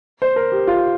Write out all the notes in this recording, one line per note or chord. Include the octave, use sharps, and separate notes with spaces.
C5
A#4
G4
F4